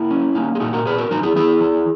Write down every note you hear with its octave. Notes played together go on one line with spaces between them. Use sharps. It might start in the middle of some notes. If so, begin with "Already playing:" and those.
Already playing: A#3 E4
C#4
A#3 D#4
G#4
A#2 D#4 F#4
F#4 A#4
B3 G#4 B4
F#4 A#4
E3 D#4 F#4
E4 G#4
B3 E4 G#4
E3